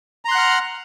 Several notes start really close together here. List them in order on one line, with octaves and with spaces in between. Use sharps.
A#5 C6 F#6 F#5 F6